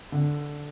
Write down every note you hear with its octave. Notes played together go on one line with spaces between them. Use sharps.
D3